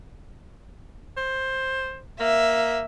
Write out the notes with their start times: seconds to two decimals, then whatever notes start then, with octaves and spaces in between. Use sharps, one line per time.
1.17 C5
2.20 A#3 E5